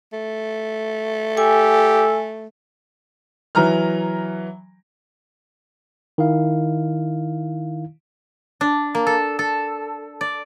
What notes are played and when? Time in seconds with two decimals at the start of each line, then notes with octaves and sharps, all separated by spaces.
0.13 A3
1.37 G4 A4 G#5
3.55 E3 F#3 A#5 F6
6.18 D#3 E4 F5
8.61 D4
8.95 A#3
9.07 A4
9.39 A4
10.21 D5